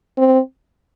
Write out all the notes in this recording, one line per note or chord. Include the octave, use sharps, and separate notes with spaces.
C4